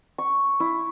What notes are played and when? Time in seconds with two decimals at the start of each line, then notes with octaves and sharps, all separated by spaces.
0.18 C#6
0.60 E4